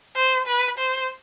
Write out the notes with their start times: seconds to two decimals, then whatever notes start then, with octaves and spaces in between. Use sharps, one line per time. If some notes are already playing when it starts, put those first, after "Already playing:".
0.16 C5
0.47 B4
0.78 C5